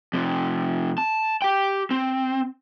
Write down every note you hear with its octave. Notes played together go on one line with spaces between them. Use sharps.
F2 C3
A5
G4 G5
C4